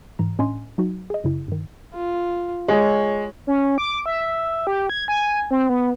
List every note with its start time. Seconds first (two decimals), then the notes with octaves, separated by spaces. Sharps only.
0.19 G#2 E3 A#5
0.39 A2 C#4 D4 D#5 G#5 C6
0.78 F#3 D#4 F#4
1.10 G#4 D#5
1.24 F#2 C#3 E4
1.48 G2 D#3
1.93 F4
2.68 G#3 C#5
3.47 C#4
3.78 D6
4.06 E5
4.67 G4
4.90 G#6
5.08 G#5
5.51 C4
5.69 B3